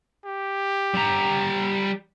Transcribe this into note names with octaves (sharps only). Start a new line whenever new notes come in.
G4
G3 A#5